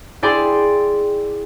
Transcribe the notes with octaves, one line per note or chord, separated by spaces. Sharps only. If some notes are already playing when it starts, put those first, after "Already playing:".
E4 G#4 D5 G5 C6